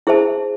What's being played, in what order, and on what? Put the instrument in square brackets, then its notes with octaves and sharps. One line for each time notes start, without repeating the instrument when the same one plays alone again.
[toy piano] E4 G#4 C5 E5 A5